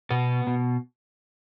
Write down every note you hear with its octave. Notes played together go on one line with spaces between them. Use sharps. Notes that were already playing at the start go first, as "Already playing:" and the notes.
B2 B3
B2